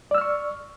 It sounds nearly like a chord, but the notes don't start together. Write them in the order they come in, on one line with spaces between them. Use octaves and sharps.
D5 E6 F6 C#6